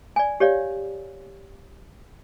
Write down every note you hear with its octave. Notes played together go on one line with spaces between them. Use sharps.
D5 G#5
G4 C#5 D5 F5